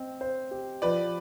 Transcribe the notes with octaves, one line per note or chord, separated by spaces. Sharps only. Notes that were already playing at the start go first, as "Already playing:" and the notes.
Already playing: C4 D#5
C5
G4
F3 B4 D5